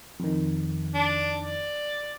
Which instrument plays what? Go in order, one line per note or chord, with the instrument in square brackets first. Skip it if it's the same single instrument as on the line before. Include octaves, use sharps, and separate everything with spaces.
[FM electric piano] F2 D#3
[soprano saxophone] D4
D5